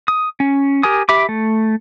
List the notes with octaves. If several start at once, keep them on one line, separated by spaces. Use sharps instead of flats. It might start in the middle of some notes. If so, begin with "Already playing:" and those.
D#6
C#4
G4 A#4 G#5 D#6
G4 E5 B5 D6
A3